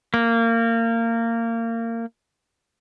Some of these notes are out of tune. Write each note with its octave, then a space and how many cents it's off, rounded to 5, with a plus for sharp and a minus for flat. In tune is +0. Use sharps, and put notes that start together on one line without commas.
A#3 -25